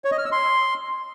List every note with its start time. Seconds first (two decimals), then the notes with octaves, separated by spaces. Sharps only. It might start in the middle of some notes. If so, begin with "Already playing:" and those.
0.05 C#5
0.11 D#5
0.18 F6
0.25 E6
0.32 C6